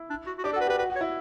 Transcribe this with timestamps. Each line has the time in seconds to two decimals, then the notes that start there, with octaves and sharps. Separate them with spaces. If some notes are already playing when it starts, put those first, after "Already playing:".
Already playing: E4
0.10 D4
0.27 F#4
0.39 F#4
0.44 D4 G4
0.53 A4
0.56 F#4 B4
0.67 G4 B4
0.78 F#4 B4
0.90 F#4
0.96 C#5
1.01 E4